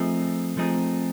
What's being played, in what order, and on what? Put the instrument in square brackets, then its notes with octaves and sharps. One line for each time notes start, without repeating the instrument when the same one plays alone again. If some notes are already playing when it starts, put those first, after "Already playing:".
Already playing: [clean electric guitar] F3 A3 C4 D#4 G#4
F3 A3 C4 D#4 G#4